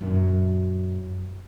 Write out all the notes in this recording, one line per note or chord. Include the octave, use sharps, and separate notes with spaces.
F#2 A#2